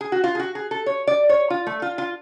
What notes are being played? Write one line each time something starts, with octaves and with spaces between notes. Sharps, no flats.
G#4
F#4
F4
G#4
F#4
G#4
A4
C#5
D5
C#5
F4
A3
F4
F4